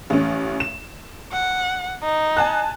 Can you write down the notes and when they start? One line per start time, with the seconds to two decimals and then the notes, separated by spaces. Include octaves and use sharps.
0.10 A1 C#4
0.60 E7
1.32 F#5
2.03 D#4
2.37 G#5 A5 F#6